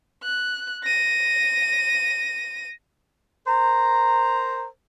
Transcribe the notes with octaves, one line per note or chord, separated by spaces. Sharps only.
F#6
A#6 D#7
A#4 C5 A#5